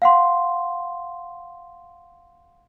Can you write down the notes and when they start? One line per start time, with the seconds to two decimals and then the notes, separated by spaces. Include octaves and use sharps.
0.02 F5 F#5 C6